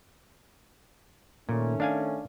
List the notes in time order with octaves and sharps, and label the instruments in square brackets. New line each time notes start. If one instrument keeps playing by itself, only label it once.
[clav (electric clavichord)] A#2 [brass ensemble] D#3 A3 C#4
[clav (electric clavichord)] D4 F5 G#5